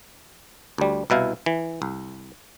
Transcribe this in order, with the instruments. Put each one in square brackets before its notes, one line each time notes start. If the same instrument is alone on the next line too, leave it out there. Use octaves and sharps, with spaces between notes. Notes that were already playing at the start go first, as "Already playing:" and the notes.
[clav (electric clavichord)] D2 G3
C2 B2 E4 F5
E3
C2